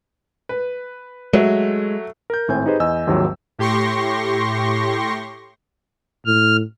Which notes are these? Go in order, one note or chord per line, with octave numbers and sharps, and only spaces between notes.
B4
F#3 G#3 A3
A#4 G6
G#1 A2 C4 G#5 G6
D#4 G4 G#4 B4 C5 D#5
E2 D#5 G#5 E6
G#1 D#2 G#2 F3 F#3
A2 G4 C6 C#6 A#6
A2 F6